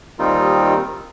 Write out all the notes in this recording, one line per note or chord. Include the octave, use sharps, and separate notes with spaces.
D#2 D#3 G3 C4 D#4 F4